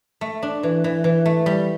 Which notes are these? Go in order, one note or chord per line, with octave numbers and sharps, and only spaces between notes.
A3
D4
E3
E3
E3
A3
G3